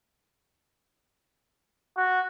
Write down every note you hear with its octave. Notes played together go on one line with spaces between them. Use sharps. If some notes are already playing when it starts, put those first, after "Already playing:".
F#4